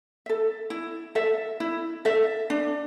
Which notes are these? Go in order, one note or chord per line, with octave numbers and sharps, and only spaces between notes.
A4 E5
E4
A4 E5
E4
A4 E5
D4